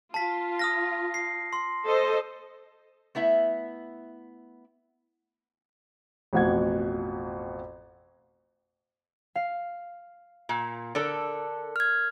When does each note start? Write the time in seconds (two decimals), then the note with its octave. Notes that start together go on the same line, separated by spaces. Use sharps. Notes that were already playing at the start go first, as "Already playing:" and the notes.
0.14 F4 A5 B6
0.59 D#6 F6 A#6
1.14 C7
1.53 C6
1.85 A4 C5 D#5
3.15 A3 B3 E4 E5
6.33 A1 F2 B2 F#5 G#6
9.36 F5
10.49 A#2
10.95 D3 A4 A#4 D5
11.76 F6 G#6